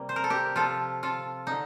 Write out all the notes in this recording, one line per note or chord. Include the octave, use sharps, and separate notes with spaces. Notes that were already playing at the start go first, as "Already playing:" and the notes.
Already playing: C3 G3 A#3
C5
A#4
A4
G4 A#4
C3 F3 C4 F4 A4
F4 A4
D3 D#4